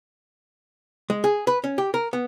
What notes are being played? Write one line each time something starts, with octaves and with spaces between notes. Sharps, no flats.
G#3
G#4
B4
C#4
G4
A#4
B3